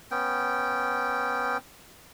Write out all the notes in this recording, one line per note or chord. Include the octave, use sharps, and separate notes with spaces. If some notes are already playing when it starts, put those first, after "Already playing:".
B3 C#4 G5